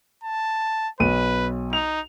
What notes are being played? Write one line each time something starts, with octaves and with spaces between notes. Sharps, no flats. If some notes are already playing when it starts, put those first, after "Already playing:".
A5
B1 B4 D#7
D#4 F7